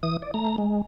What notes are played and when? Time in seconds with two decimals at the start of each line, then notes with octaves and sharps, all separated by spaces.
0.03 E3 D#6
0.22 D5
0.34 A3 A#5
0.58 G#3